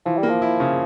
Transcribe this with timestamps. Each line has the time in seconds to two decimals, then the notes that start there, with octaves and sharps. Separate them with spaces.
0.06 E3 F3
0.17 G3
0.23 A#3
0.29 F3
0.42 E4
0.60 C#3